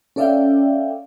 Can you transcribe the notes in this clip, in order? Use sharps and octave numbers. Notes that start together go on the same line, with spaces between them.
C#4 A4 D5 E5 F5 G5